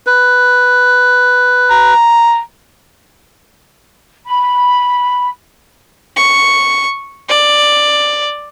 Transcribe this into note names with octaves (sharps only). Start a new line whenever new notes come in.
B4
A#5
B5
C#6
D5